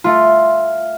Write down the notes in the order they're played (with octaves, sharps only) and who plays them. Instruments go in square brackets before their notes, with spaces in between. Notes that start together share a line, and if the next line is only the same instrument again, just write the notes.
[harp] A3 F4